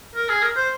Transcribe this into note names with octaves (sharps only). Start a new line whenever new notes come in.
A#4
G#4
A#4
C5